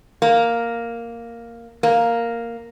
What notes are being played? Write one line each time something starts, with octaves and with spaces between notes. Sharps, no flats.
A#3
A#3